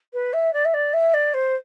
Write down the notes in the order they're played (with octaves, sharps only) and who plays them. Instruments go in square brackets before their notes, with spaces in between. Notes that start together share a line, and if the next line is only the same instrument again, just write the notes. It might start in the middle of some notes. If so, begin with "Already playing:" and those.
[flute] B4
E5
D5
E5
D5
E5
D5
C5